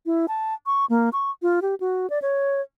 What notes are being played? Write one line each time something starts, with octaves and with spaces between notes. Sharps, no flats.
E4
A5
C#6
A#3
C#6
F4
G4
F#4
D5
C#5